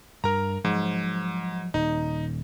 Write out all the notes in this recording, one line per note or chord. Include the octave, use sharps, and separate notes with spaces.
G2 A#4 A#5
G#2 F3 F#3
D#1 D#4